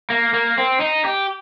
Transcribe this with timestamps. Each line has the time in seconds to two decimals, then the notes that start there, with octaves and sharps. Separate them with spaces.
0.10 A#3
0.34 A#3
0.58 C4
0.80 D#4
1.05 G4